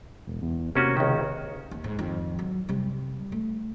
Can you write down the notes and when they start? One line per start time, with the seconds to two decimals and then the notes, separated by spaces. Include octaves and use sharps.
0.27 E1
0.42 E2
0.75 C3 A#3 C#4 F#4
0.97 C#2 D#3
1.71 D#2
1.84 G#2
1.99 F2 D#3
2.39 F#3
2.69 C3 G3
3.32 A3